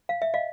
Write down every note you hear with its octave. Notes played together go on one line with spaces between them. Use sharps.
F5
E5
D#5 F5